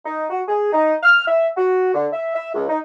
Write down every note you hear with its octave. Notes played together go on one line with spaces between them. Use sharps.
D#4
F#4
G#4
D#4
F6
E5
F#4
D3
E5
E5
C#2
D#4